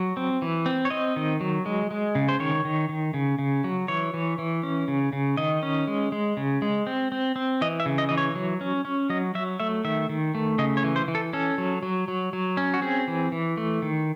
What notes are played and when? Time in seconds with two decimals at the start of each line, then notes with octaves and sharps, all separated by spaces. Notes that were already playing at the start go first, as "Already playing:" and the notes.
Already playing: F#3
0.17 C4
0.42 E3
0.66 C4
0.85 C#5
0.90 C4 D#5
1.16 D#3
1.41 F#3
1.66 G#3
1.91 G#3
2.15 C#3
2.29 C5
2.40 D#3 C#5
2.65 D#3
2.89 D#3
3.14 C#3
3.39 C#3
3.64 F#3
3.88 E3 C#5
4.14 E3
4.39 E3
4.63 C#4
4.88 C#3
5.13 C#3
5.37 D#3 D#5
5.63 C#4
5.87 G#3
6.12 G#3
6.37 C#3
6.62 G#3
6.87 C4
7.12 C4
7.36 C4
7.61 E3 D#5
7.80 E5
7.86 C#3
7.98 D#5
8.09 E3 D#5
8.17 C#5
8.35 F#3
8.61 C#4
8.85 C#4
9.10 F#3 D#5
9.35 F#3 E5
9.60 A3 E5
9.84 D#3 E5
10.09 D#3
10.35 A3
10.58 C#3 D#5
10.77 C#5
10.84 E3
10.96 C5
11.08 E3
11.15 A4
11.33 C#4 A4
11.58 F#3
11.83 F#3
12.08 F#3
12.33 F#3
12.57 C#4
12.74 F#4
12.82 C4 G#4
13.08 E3
13.32 E3
13.57 A3
13.82 D#3